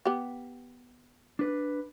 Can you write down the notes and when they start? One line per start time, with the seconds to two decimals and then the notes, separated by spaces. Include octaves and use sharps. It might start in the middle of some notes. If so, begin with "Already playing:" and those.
0.05 B3 G4
1.39 D4 B4